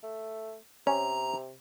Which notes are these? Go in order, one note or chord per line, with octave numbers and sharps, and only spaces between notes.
A3
C3 C#4 A#5